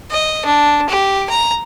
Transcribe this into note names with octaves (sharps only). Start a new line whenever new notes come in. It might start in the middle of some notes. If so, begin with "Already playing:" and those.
D#5
D4
G4
A#5